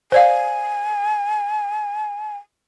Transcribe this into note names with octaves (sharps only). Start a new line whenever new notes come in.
C5 D5 F5 G#5